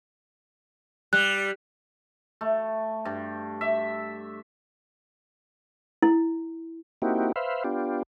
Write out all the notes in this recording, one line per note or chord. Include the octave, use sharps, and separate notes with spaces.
G3 F#6
A3
G2
E5
E4
A#3 C4 D#4 E4 F#4 G4
B4 C5 E5 F5
B3 D4 F4 G4